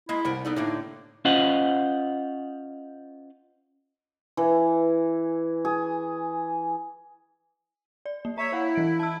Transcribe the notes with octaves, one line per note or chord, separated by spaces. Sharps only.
G#3 A#3 E4 D#5
C2 A#4 F#5
B3 D#4 A4 D5
A2 D3 A#3 D4
C#4 F4 C5 D#5 F5 F#5
E3
G#4
D5
A#3
C#5 E5 A#5
E4 C#5 F5 F#5
E3 D7
A5 E6